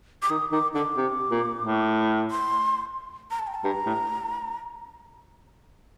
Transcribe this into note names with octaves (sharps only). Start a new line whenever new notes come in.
D6
D#3 D#6
D#3 D6
D3 D6
C3
A#2
A2
C6
A#5
A5
G5
A5
G2 A#5
A2